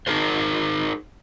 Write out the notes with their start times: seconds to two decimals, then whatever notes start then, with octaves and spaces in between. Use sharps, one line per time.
0.07 D#4 G#4 A#4 C5